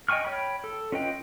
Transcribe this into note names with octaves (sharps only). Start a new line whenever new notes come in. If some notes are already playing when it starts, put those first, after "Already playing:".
D#5 G5 G#5 C#6 F6
C#5 G5 B5
A4
C#4 F4 B4 D#5 G5